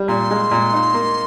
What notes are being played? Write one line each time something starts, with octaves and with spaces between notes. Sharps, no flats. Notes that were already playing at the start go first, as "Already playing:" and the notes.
Already playing: G3
A#2 C6
G#3
A#2
D#4
A#3